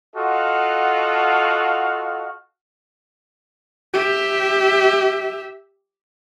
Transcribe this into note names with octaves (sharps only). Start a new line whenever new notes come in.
F4 F#4 A4 D#5 F5 F#5
G4 E5